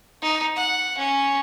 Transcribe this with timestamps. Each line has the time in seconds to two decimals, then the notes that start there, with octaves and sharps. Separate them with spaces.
0.22 D#4
0.56 F#5
0.98 C#4